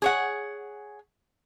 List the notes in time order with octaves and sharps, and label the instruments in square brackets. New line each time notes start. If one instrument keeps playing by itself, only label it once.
[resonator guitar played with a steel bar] G#4 C#5 F#5